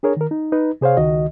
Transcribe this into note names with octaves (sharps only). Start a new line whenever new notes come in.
D4 G#4 A#4 C#5
D#3 A#4
D#4
D#4 B4
C3 G#4 C5 C#5 F5
C#2 D#3 F#4 D#5